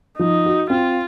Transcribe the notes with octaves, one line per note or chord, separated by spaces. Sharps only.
F3 D#4
F#4
C4 F4